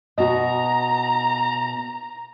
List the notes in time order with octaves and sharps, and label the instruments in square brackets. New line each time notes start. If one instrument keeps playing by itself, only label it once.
[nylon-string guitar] B2 F#4 [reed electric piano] D#5 [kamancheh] A#5